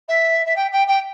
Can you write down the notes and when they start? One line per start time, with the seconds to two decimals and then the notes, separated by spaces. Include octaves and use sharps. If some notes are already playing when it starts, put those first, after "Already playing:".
0.08 E5
0.46 E5
0.56 G5
0.72 G5
0.87 G5